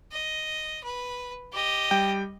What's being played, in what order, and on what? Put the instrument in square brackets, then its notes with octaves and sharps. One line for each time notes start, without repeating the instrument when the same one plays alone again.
[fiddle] D#5
B4
G4 D#5
[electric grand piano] G3 G5